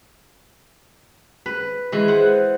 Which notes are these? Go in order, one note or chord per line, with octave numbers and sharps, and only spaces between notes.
B4
E3 G#3
C5 F#5